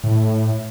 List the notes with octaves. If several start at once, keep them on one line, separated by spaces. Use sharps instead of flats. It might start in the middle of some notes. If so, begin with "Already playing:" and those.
A2